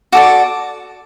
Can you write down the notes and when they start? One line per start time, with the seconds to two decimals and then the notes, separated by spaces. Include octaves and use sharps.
0.12 F#4 A4 D5 D6